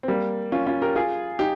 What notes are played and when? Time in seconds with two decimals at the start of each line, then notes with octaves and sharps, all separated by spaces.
0.03 C4
0.08 G3 A#3
0.52 C#4 F4
0.66 C#4 F4
0.82 G4 A#4
0.96 F4 G#4
1.39 D#4 G4